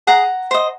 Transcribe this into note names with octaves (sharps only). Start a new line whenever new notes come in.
G#4 F#5 A#5
C5 D#5